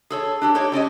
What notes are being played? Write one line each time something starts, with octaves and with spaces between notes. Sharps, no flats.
G#4 A4 C#5
D4 G4 A4
D#4 G4 A4 C#5 D5
G3 C#4 D5 D#5